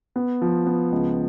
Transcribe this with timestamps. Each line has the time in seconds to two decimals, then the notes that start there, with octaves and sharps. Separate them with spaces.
0.16 B3
0.42 F3
0.67 B3
0.92 C#2